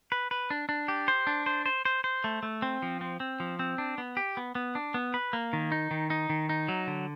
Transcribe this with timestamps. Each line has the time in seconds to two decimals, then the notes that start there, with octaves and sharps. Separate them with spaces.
0.12 B4
0.31 B4
0.50 D4
0.69 D4
0.88 G4
1.08 C5
1.27 D4
1.46 C5
1.66 C5
1.85 C5
2.04 C5
2.24 A3
2.43 A3
2.62 C4
2.82 F3
3.01 C4
3.20 C4
3.40 F3
3.59 C4
3.78 D4
3.98 B3
4.17 G4
4.37 B3
4.55 B3
4.75 D4
4.94 B3
5.14 B4
5.33 A#3
5.53 D#3
5.72 D#4
5.91 D#3
6.10 D#4
6.30 D#3
6.49 D#4
6.68 F#3
6.87 D3